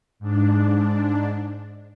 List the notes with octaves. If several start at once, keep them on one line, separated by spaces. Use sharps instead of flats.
G#2 D4